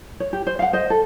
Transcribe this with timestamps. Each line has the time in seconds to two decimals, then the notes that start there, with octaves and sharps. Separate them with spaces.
0.20 C#5
0.33 G4
0.47 C5
0.59 F5 F#5
0.73 C5 D#5
0.90 A4